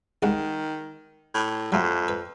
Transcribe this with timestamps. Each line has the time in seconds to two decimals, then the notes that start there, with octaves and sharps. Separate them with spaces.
0.23 C2 D#3 G#3 F#5
1.34 A2
1.72 F2 F#3 A3
2.08 B4